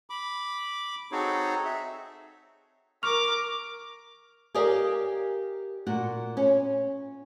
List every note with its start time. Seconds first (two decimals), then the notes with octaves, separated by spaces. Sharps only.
0.10 B5 D6
1.12 C4 D#4 F#4 G#4 A4 C#5
1.65 E5
3.03 A#4 C#6 D6 F6 F7
4.55 G4 A#4 D5 D#5 F5 G#5
5.87 A#2 F#4 F#5
6.37 C#4